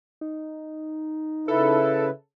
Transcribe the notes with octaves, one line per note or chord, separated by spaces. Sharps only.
D#4
C#3 E4 A4 B4